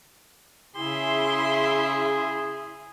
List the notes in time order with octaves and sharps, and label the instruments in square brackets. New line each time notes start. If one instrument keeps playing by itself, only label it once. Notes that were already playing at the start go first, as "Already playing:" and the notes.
[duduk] C#3 [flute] E4 [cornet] G#4 [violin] E5 C6